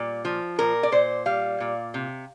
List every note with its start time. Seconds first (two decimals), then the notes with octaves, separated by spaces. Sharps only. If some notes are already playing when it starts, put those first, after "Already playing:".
Already playing: A#2 G3
0.25 F3
0.59 A#2 A#4
0.83 D5
0.92 A#2 C5
1.26 G3 F5
1.60 A#2
1.94 C3